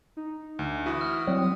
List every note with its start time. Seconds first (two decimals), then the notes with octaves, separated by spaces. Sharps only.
0.17 D#4
0.59 D2
0.86 E3 E4 F#4 D#6
1.01 F6
1.27 F#3 G3 C4